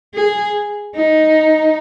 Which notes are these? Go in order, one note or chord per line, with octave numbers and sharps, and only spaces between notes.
G#4
D#4